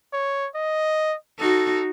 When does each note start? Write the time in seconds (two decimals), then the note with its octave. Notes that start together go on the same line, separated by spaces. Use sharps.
0.13 C#5
0.55 D#5
1.39 D#4 F#4 A4